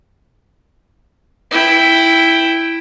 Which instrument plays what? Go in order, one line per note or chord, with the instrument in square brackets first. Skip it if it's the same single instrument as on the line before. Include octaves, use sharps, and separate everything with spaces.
[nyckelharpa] E4 G5